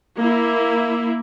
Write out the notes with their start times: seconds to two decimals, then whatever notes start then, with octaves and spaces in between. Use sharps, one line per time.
0.18 A#3 E4